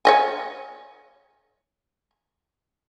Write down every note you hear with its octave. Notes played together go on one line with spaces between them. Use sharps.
C#5 D#5 G#5